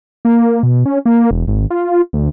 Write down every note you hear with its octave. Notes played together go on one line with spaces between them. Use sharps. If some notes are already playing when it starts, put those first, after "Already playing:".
A#3
B2
C#4
A#3
E1
G#1
F4
D2